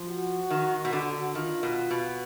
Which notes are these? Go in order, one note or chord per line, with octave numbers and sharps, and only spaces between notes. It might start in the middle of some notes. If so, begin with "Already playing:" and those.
Already playing: F3
F#4
D#3
B2
D3
D#3 F4
B2
B2